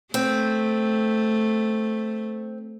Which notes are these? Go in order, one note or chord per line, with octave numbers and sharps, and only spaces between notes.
A3 C4